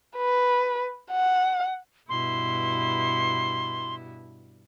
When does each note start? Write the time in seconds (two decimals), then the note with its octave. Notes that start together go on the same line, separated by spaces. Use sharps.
0.17 B4
1.11 F#5
2.09 G2 B2 E4 C6